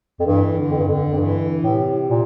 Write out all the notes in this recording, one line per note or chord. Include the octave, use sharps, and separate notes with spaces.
F2
G2 E3
D3
F2
G2
F2 D3
F2
G2 E3
A2 C3
A#2